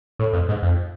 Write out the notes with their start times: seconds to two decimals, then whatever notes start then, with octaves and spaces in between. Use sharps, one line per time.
0.19 A2
0.33 F2
0.49 G#2
0.63 F2